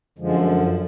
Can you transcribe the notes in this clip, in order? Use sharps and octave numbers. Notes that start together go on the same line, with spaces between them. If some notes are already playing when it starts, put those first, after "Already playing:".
F#2 D3 F3 G#3